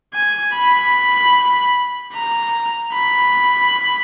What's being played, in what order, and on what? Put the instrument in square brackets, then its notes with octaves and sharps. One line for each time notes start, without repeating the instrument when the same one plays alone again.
[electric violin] G#5
B5
A#5
B5